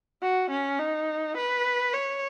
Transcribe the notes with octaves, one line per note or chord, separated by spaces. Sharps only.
F#4
C#4
D#4
B4
C#5